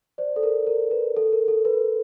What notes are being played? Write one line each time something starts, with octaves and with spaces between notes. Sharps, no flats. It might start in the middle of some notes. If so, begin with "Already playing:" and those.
C5 D5
A4
A#4
A#4
B4
A4
A#4
A4
B4